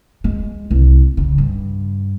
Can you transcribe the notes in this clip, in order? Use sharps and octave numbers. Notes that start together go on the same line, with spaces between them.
G#3
C2
C#3
G2